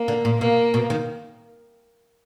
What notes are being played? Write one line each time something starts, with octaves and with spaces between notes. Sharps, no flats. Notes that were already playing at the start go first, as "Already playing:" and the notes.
Already playing: A#3
D3
A#2
B2 A#3
B2
D#3